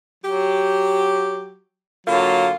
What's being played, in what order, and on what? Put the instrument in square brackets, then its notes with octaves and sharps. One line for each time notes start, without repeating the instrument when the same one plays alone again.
[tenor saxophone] F#3 [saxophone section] G4
[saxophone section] D3 A#3 F4 [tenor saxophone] F#3